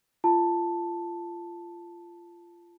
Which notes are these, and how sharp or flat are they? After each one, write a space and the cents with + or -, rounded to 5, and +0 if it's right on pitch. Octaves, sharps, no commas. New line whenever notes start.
F4 -20 A5 +0